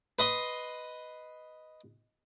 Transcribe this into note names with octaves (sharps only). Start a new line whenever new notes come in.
B4 D#5 C6